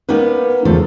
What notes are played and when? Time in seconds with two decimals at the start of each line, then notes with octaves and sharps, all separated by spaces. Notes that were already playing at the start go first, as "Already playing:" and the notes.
0.09 A#3 B3 C#4 D#4 B4
0.65 E2 C#3 F3 A3 A4